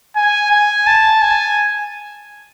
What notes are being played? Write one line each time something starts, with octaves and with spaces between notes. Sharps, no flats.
G#5
G#5
A5
G#5